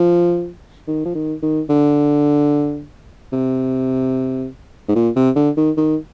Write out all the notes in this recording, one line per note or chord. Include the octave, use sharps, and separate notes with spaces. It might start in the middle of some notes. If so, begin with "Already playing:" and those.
Already playing: F3
D#3
F3
D#3
D#3
D3
C3
G#2
A#2
C3
D3
D#3
D#3